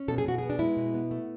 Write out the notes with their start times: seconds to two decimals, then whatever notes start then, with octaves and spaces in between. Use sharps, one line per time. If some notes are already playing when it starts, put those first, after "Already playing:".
Already playing: C#4
0.08 B2 A4
0.18 G#4
0.25 B2 F#4
0.38 B3 G#4
0.50 D4
0.59 G#3 E4
0.77 B2
0.94 B3
1.11 A3